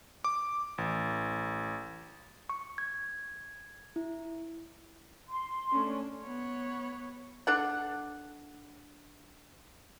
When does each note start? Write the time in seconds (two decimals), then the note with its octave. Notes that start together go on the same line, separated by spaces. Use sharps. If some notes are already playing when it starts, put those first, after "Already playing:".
0.24 D6
0.78 A1
2.49 C#6
2.78 G#6
3.96 E4
5.30 C6
5.72 A3 C#4 D4
6.22 B3 C#5
7.47 D4 A4 F#5